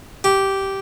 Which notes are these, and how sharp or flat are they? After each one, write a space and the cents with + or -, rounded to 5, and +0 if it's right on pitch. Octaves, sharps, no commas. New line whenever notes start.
G4 -10